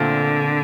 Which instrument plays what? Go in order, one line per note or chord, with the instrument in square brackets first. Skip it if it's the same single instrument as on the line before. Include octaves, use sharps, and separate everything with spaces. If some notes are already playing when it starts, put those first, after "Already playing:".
Already playing: [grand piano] A#2 A3 C4 F4 [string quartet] D3